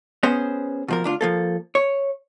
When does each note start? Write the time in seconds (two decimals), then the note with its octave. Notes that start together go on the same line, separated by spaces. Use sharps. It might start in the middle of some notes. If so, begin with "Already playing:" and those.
0.23 B3 C#4 G#4 C5
0.88 B2 F3 A#4
1.04 D2 D4 F4
1.21 F3 A#3 A4
1.75 C#5